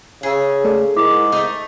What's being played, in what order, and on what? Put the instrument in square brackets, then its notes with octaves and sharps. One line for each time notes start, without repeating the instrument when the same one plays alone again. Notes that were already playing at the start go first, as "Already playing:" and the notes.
[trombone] C#3 [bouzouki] G#4 E5
[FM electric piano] A3 A4 D5
[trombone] G#2 [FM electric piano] E4 A#4 [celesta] D6
[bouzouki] A3 D#4